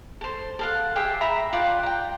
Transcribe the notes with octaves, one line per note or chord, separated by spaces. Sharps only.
A4 C5
A4 F5 F#5
G4 G#4 E5 G5
E5 A#5 B5
F4 D5 F#5 G5
G5 A#5